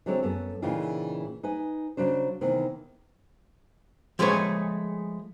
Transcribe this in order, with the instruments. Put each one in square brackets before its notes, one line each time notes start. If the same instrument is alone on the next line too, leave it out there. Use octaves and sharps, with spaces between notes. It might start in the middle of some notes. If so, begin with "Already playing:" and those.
[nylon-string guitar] D3 F#3 G#3 C4 C#5
F#2 B3 A4
A#2 C#3 E3 D#4 F4 G5
D#4 B4 G#5
C#3 F#3 D4 C5
C3 D#3 E3 B3
[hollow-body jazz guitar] F3 G#3 A3 G#4 B4 C#5